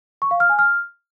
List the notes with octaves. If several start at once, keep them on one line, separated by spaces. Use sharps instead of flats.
C#6
F5
F6
G#5
F6